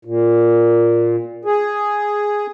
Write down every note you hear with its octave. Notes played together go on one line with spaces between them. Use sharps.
A#2
G#4